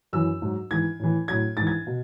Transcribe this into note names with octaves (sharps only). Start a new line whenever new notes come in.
F#2 E3 E6
G#2 F#3
G#2 E3 G#6
A2 E3
A2 F#3 G#6
G#2 E3 A6
G#6
B2